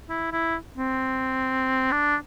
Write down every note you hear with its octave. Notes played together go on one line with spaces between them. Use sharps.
E4
E4
C4
D4